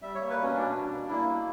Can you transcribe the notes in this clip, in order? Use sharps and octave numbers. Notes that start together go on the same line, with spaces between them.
G3 E5
C#5
A#3
B4
B2 C#4
B2 D4
G3
A#3
A#3 E4
B2